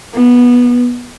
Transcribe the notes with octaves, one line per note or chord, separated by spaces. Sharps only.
B3